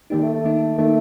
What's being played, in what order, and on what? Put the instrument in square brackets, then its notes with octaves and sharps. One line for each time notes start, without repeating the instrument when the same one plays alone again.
[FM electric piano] D#3 A#3 D#4 [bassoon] G3
[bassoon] A3
A3
[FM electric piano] D#3 A#3 D#4
[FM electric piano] D#3 A#3 D#4 [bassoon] A3